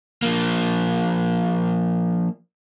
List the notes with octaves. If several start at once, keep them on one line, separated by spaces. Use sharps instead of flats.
F3 A#3